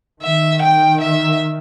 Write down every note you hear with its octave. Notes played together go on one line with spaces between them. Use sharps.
D#3 E5
G5
E5